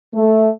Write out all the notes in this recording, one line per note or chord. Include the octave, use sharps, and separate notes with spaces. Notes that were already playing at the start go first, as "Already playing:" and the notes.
A3